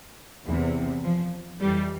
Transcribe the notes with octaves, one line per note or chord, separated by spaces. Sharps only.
E2 C3 E3
F3
F2 E3 G3